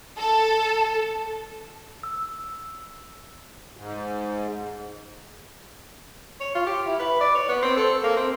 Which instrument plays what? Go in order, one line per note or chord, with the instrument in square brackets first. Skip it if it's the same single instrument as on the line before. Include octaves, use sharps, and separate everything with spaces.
[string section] A4
[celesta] E6
[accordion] G#2
[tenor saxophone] C#5
F4
G4
E4
B4
D5
C#5
B3
C4
A4
A#3
C4